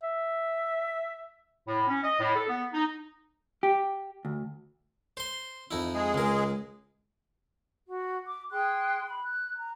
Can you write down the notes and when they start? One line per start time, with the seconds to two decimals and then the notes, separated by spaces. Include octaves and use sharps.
0.03 E5
1.68 A2
1.88 C#4
2.04 D#5
2.20 A2
2.35 A4
2.49 B3
2.74 D#4
3.63 G4
4.25 D2
5.17 C5 C6
5.71 F2 D#4 E4
5.95 G#3 G#4
6.14 C#2 A#4
7.87 F#4
8.26 D6
8.51 G#4 G5 C6 F#6
9.06 B5
9.23 F#6
9.55 A#5